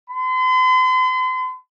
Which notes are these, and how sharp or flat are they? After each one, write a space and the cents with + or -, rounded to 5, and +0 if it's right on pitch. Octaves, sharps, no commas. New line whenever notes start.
C6 -45